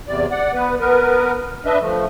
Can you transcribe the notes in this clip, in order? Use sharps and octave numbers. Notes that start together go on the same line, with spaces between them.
E2 C3 D5
D5 F#5
B3 B4
B3 A#4 B4
D4 B4 D#5 E5
F3 A3